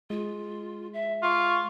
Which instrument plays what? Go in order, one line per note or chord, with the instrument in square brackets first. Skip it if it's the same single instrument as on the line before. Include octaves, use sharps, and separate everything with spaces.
[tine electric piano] G#3 [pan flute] F4
[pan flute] E5
[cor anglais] F4 [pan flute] C#6